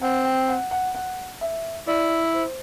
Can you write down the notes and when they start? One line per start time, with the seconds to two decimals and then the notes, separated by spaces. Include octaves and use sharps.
0.01 C4 F#5
0.25 G5
0.48 F#5
0.71 F#5
0.94 F#5
1.41 E5
1.87 E4 D5
2.33 C5